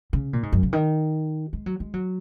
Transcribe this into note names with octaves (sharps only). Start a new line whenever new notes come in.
C#3
A#2
G#2
F#2
C#3
D#3
G#3
F#3
G#3
F#3